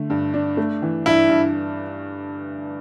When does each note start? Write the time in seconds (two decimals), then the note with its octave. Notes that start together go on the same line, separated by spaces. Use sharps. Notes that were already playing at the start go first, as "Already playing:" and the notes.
Already playing: D3 A3
0.10 G2
0.34 D4
0.57 A3
0.82 E3
1.06 G2 E4
1.29 G2